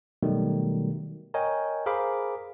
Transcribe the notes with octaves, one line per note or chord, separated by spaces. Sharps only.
B2 D#3 F#3 G3 A3
A#4 C#5 D#5 G5 G#5
G#4 A#4 C5 F5 B5 D6